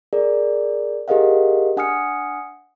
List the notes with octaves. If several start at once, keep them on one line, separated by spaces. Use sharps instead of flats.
G#4 A#4 D5
G4 G#4 A#4 D#5 F5 F#5
D4 F#5 G#5 D#6 F6 C#7